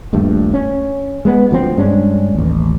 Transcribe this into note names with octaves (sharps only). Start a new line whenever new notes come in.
D#1 A#1 G2 A3
C#4
G#3 B3
D2 F3 C4
G2 G#3 C#4 D4
A1 D#2